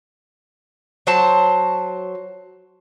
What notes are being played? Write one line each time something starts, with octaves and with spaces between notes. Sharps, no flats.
F#3 C5 A5